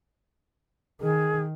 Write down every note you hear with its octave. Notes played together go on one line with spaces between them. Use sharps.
D#3 G#4